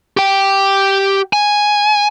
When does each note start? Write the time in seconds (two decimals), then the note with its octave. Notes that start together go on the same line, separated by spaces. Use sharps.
0.17 G4 G5
1.33 G#5